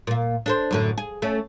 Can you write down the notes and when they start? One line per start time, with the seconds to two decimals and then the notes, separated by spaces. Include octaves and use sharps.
0.07 A#2 A#3
0.46 D4 A4 C5
0.71 F#2 A2 D3
0.98 G#4
1.22 A3 C#4